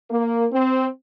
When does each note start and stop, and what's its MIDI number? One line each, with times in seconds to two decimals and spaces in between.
0.10 0.46 58
0.52 0.85 60